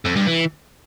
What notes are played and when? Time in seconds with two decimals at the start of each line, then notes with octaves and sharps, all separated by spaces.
0.06 F2
0.16 G2
0.27 E3